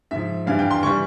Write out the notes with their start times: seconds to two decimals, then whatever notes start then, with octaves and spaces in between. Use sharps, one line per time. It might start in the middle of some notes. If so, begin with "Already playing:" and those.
0.11 G#2 F3 E5
0.47 G2 E3 G3 F5
0.59 G5
0.71 C6
0.83 E3 G3 C#6